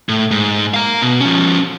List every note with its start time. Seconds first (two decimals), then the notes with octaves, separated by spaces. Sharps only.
0.09 A2
0.31 G#2
0.74 F5 A#5
1.02 B2
1.21 F3 C#4